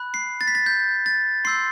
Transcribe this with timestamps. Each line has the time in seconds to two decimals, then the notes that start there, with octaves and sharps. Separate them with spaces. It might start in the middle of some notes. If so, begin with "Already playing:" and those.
Already playing: B5 F#6
0.14 C7
0.41 A6
0.48 B6
0.55 A6
0.66 G6
1.06 A6
1.45 C6 E6 G6 C7